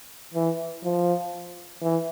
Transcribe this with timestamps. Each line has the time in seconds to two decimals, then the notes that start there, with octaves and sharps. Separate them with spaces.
0.34 E3
0.84 F3
1.82 E3